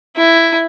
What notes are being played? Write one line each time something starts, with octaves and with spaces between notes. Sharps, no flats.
E4